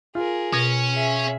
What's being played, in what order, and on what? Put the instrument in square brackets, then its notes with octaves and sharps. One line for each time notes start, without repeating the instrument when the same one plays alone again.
[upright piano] F4 [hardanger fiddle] G#4 A#4
[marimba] B2 G#6 A#6 [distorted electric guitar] C#4
[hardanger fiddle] G#4 E5